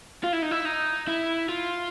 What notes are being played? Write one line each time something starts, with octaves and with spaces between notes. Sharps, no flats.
F4
E4
D#4
E4
D#4
E4
F4